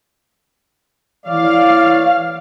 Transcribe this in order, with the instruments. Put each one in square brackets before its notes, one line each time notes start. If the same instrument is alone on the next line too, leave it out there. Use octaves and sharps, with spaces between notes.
[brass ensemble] E3 C#5 D5 [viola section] F5